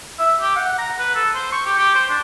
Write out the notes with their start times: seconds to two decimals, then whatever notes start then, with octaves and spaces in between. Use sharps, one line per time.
0.19 E5
0.41 G4
0.56 F#5
0.78 A#5
0.99 B4
1.15 A4
1.35 C5
1.52 C#6
1.66 G4
1.78 G4
1.95 C5
2.09 D4